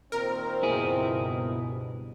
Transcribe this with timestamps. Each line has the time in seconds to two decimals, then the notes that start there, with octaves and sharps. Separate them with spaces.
0.12 A#2 D#3 C4 A#4
0.63 C#2 G2 B2 E4 G#4